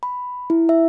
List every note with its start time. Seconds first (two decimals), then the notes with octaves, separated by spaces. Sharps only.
0.03 B5
0.50 E4
0.69 E5